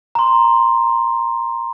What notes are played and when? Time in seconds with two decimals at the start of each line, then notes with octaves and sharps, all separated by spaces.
0.15 A#5 C6